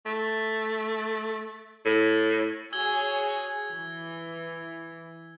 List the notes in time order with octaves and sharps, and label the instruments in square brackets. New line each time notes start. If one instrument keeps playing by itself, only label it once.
[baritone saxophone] A3
A2
[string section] F#4 G#4 C#5 [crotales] E6 G#6 G7
[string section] E3